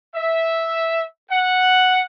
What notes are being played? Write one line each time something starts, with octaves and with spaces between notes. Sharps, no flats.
E5
F#5